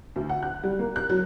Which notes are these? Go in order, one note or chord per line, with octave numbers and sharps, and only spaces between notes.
D2
F#5
F#6
G3
A#3
F#6
F#3